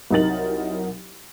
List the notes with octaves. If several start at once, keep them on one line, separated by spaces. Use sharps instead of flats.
C2 F#3 D#4 A#4 A6 F#7